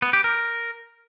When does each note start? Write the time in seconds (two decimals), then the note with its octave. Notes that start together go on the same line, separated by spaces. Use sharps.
0.02 B3
0.13 G4
0.24 A#4